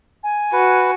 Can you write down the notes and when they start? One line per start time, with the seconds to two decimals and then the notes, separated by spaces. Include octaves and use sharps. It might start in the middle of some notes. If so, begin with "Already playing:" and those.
0.23 G#5
0.53 F#4 B4